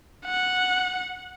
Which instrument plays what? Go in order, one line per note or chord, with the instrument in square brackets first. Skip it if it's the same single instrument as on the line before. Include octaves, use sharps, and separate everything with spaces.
[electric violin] F#5